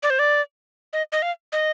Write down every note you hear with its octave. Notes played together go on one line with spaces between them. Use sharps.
D5
C5
D5
D#5
D#5
F5
D#5